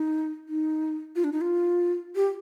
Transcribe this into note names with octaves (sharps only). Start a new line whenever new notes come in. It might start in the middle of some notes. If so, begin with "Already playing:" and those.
Already playing: D#4
D#4
F4
D4
D#4
F4
G4